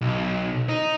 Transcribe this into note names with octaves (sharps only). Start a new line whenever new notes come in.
B1
D#4